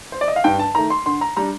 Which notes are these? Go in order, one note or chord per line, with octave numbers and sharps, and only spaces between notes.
C5
D5
D#5
F5
G2 G5
A5
D#3 A3 A#5
C6
D3 C6
A#5
G3 D4 A#5